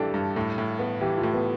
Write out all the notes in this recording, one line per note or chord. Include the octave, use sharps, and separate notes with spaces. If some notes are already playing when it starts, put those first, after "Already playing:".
Already playing: G2 E3 G3 D4 G4 A4
G2
A2
A2
B3
E3 G4
F4
A2
B3